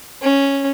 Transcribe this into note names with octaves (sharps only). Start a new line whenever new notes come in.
C#4